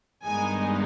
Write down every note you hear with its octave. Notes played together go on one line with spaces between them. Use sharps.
G2 D#3 G#3 B3 D#4 G#5